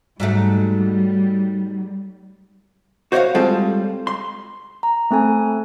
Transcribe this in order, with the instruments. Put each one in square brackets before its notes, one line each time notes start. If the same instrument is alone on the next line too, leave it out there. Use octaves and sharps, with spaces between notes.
[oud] G#2 F#3 A3 [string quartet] G3
[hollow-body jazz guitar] F#4 C5 C#5 D#5 F5 F#5
G3 G#3 C4 F4 A4 C5
C6
[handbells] A#5
A3 C4 A4 G#5